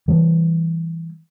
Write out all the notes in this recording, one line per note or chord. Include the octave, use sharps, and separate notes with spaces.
E3 G3